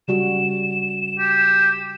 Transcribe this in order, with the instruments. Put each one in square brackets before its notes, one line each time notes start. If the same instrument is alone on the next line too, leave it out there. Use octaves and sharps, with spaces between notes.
[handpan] C#3 G3 F#4 [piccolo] E7
[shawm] G4